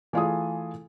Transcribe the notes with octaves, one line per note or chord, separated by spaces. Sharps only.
E3 A3 F4 G#4 G#5 D#6